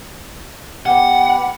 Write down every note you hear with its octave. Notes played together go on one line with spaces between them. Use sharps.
B3 G4 F#5